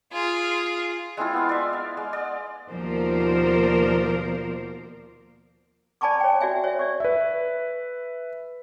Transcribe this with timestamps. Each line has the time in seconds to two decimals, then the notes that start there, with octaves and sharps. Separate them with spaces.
0.12 F4 G#4
1.17 G#3 C4 E4 F4
1.33 B3 F5
1.49 D5 E5
1.73 F5
1.97 G#3
2.13 D5
2.69 D#2 B2 F3 A#4 C5 D5
6.01 D5 G#5 A5 B5 C#6 D6
6.20 C#5 G5
6.41 F#4 D5 E5 G#5
6.64 C#5 E5
6.79 D5 C#6
7.00 B4 E5